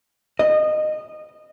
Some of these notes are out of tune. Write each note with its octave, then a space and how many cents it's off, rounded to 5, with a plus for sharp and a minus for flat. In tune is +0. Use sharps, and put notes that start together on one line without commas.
D#5 -20